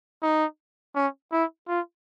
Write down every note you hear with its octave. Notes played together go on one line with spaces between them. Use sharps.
D#4
C#4
E4
F4